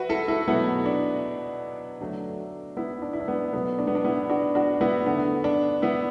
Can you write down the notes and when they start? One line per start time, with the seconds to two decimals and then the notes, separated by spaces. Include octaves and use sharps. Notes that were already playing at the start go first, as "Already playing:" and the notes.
Already playing: F#4 B4 E5
0.09 E4 A4
0.28 E4 A4
0.47 B2 F#3 A3 B3 E4
0.86 D4
2.00 D3 F#3 A3
2.77 B3 E4
3.02 D4
3.13 E4
3.20 D4
3.28 B3
3.53 B2 F#3 A3 B3
3.79 D4
3.87 B3
3.95 D4
4.04 B3 E4
4.30 D4 F#4
4.55 D4 F#4
4.81 B3 E4
5.06 D3 A3 B3
5.44 D4
5.82 B3 E4